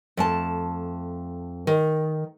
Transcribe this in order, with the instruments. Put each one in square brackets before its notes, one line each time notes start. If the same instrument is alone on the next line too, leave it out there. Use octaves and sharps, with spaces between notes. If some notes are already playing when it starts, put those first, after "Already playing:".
[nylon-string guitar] F2 A3 A5
D#3